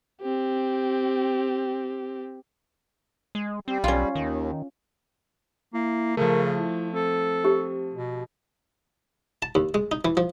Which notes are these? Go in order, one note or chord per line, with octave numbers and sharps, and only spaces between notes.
C4 G4
G#3
G3 C4
B1 C#4 F4
D#2 D#3
A#3 E4
C#3 F3 A3 A#4
E4
C4 A4
G4
B2
A5
D#2
G#3
D#4
E3
F3